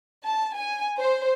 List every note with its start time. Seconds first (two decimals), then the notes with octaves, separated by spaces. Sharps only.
0.25 A5
0.56 G#5
0.99 C5